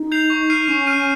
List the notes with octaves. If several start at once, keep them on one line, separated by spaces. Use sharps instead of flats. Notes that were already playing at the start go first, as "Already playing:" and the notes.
Already playing: D#4
G6 C7 F7
C#6
F6 C7 D#7
C#4 C#6
F6 C7 D#7